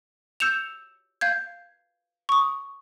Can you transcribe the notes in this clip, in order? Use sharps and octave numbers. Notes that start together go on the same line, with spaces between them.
E6 G6 C#7 E7 F7
F5 G6 G#6
C#6 D#6